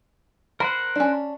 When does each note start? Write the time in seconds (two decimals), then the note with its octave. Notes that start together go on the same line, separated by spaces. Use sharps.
0.60 A#4 C5 F#5 B5
0.96 C#4 D4